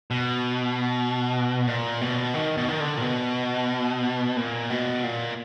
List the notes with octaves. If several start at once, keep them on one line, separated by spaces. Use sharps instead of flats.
B2
A#2
B2
D#3
B2
D#3
D3
A#2
B2
A#2
B2
A#2